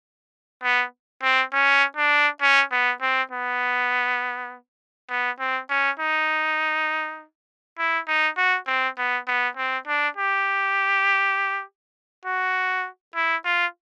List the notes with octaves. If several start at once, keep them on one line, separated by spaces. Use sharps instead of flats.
B3
C4
C#4
D4
C#4
B3
C4
B3
B3
C4
C#4
D#4
E4
D#4
F#4
C4
B3
B3
C4
D4
G4
F#4
E4
F4